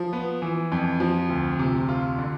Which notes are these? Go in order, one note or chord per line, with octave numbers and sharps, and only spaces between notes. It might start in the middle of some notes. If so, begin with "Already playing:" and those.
Already playing: F3
B3
E3
F2
F3
D2
C3
F4
D3